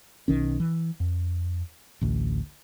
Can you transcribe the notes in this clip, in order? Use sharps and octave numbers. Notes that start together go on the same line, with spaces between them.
B1 D#3 C#4
E3
F2
A1 D2